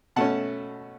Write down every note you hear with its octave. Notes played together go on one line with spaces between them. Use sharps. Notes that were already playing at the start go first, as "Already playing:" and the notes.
B2 A3 C#4 F#5 A5